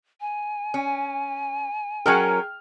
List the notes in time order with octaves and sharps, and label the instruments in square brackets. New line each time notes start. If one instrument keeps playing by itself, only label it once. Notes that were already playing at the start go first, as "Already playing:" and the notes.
[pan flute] G#5
[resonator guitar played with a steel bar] C#4
[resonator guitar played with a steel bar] F#3 C#4 A#4 [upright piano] G#4 G5 F6